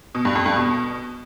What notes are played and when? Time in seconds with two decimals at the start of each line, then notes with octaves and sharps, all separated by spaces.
0.15 B2
0.25 G2
0.35 F2
0.46 G2
0.56 B2